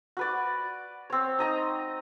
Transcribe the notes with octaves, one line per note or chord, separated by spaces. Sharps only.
F#4 B4 D5
C4 C#5
D#4 D#5 A#5